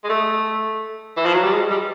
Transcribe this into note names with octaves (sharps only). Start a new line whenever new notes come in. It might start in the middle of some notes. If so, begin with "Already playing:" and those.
G#3
A3
E3
F3
F#3
G3
G#3
G3